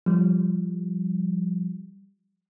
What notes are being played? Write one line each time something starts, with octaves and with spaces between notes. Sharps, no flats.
F3 G3